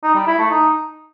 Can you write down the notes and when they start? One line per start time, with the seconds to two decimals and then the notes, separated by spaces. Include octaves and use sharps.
0.03 D#4
0.15 G3
0.27 E4
0.38 A3
0.50 D#4